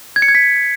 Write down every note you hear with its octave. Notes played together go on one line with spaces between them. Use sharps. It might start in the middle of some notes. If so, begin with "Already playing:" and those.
G#6
C#7
G#6
B6